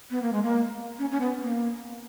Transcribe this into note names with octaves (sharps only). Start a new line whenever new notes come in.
B3
A#3
G#3
A#3
C#4
C#4
B3
A#3